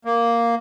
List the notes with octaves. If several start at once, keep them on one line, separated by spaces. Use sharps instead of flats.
A#3